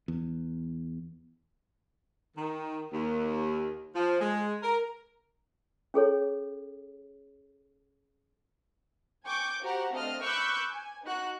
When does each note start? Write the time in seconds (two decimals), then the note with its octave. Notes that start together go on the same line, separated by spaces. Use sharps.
0.08 E2
2.36 D#3
2.91 D#2
3.95 F3
4.20 G#3
4.61 A#4
5.94 C#4 G#4 A4 C#5
9.24 G5 G#5 C#6 D6 G6
9.62 F#4 G4 C5 F#5 A#5
9.92 A3 C4 D4 D#5 F5 F6
10.22 B5 C#6 D6 E6 F#6 G6
10.70 G#5
11.05 D#4 F#4 F#6